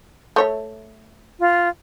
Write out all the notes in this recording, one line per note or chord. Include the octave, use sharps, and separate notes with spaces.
A3 C#5 E5
F4